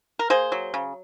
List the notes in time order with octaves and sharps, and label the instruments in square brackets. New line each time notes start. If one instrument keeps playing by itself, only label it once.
[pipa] A#4
A#3 G#4 C5
F#3
C#3